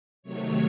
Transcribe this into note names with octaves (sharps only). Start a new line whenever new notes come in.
C3 D#3 F#3 A3 C#5